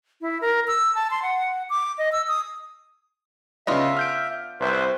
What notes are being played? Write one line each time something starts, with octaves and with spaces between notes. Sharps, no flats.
E4
A#4
E6
A5
C6
F#5
D6
D#5
E6
D#6
C#3 B3 D4 F4 D#5 E5
F6 G6 D7
C2 B4 C5 E5